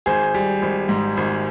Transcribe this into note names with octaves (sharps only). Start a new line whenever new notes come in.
G#1 G#4 C5
G3
G#1
G#2
G#1